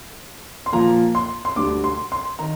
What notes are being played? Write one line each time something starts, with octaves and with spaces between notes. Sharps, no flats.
C6
A#2 F3 A#3 A#5
C6
C6
D2 D3 G3 D6
C6
C6
D#3 A#5